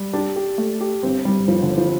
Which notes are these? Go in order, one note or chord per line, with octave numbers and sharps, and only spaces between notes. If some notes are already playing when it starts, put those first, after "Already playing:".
Already playing: G3
D4 G4
G4
A3
G4
G1 C4
G2 G3
G1 F3
D3
G1
F3